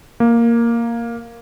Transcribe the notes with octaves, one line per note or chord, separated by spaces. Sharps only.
A#3